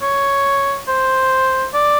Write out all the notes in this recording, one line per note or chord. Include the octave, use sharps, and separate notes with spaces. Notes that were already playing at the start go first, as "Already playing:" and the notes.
C#5
C5
D5